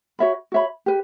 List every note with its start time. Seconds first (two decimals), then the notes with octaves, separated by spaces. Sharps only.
0.19 F#4 C#5 E5 B5
0.52 F#4 C#5 E5 B5
0.86 G4 B4